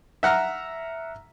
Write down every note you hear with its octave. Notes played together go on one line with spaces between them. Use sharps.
E5 F#5 A#5 F6